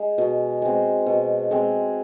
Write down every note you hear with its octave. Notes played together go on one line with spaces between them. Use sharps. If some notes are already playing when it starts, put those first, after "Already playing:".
Already playing: G#3
B2
G#3 C4
B2
G#3 C4